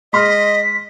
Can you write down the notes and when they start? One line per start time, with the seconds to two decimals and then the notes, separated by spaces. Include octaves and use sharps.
0.13 G#3 D#5 C6 F6 B6